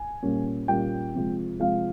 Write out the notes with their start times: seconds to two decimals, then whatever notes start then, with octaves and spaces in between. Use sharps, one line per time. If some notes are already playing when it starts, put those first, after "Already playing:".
Already playing: G#5
0.23 A#2 G3 A#3 C#4
0.68 A#2 G3 A#3 C#4 G5
1.15 C3 F3 G#3
1.60 C3 F3 G#3 F5